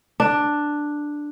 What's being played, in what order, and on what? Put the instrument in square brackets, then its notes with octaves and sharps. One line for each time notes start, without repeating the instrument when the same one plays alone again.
[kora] D4